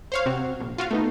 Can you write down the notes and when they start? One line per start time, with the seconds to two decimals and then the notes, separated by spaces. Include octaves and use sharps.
0.12 C5 C#5 F5
0.26 C3 C4 F#4
0.60 A#1
0.78 F4 F#4 F5
0.91 A3 B3 D#4